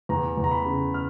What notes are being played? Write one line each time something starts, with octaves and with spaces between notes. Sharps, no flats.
E2 A#5
E2
A#5
B5
C#3
F6